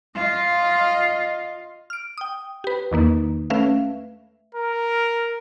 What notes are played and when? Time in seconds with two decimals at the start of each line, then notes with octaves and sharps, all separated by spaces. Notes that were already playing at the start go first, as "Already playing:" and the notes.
0.15 F4 D#5
1.90 F6 D7
2.18 G5 D#6
2.64 G4 B4
2.92 E2 D#3 A#3 D#4
3.50 A3 C#4 B4 E5 F5
4.55 A#4